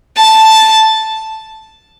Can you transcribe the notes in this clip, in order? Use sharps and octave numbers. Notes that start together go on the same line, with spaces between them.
A5